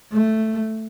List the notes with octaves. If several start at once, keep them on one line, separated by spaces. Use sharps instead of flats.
A3